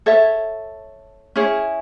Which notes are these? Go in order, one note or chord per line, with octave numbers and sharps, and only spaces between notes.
A4 C#5 E5
C#4 E4 G#4 C#5